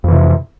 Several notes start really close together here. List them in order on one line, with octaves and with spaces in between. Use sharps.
F2 E3 C3